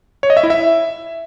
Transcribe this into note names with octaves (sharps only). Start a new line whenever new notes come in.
C#5
D#5
E5
E4
E5